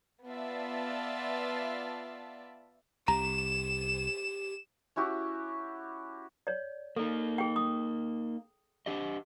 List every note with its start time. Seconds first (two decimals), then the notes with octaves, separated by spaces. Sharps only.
0.25 B3 F4 D5 E5 A5
3.08 C2 G4 A#5 E7
4.96 C#4 E4 F#4 G4
6.47 C#5 D5
6.96 A#3 D#4 A4
7.38 G#4 G5
7.56 D#6
8.86 D4 G4 D#5